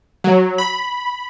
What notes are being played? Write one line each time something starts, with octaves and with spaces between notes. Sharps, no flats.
F#3
B5